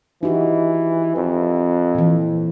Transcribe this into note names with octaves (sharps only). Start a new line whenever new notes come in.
E3 D#4 F#4 G4
F2
A#2 E3